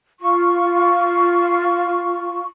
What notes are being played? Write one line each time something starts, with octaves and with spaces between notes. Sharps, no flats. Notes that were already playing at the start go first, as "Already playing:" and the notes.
F4 C#6